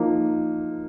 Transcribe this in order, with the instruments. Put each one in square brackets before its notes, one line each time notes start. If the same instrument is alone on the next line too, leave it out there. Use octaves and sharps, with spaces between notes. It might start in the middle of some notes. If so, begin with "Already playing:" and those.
Already playing: [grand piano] F3 A#3 D#4